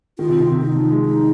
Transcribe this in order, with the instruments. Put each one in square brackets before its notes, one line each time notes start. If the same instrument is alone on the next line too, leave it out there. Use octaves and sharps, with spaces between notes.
[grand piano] D#3 [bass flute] F4
[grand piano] C3
D#3
C3
[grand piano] D#3 [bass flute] D#4
[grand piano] F3
G#3
[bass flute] D#4